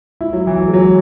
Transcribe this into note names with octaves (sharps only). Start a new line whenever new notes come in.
E4
F#3
E3
F#3
G#3
F#3